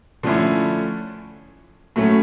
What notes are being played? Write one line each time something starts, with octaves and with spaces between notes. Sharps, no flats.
D3 F3 A3 C#4 E4
A2 F#3 A3 C#4